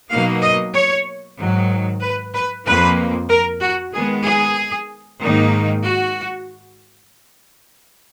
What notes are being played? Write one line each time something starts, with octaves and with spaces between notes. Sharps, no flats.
B2 F#3 A#3 D#4 F5
D#5
C#5
G#2 D#3 F#3
B4
B4
F2 F3 A#3 B4
A#4
F#4
D#3 G#3 B3 G#4
G#4
G#2 D#3 A#3 D#4
F#4